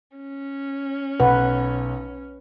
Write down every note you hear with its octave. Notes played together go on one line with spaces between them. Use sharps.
C#4
B1 B4 F#5